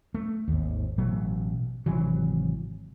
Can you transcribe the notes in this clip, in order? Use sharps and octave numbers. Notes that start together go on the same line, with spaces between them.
A3
G#1 D#2
A1 B2 F#3 A3
G#1 C3 E3 F#3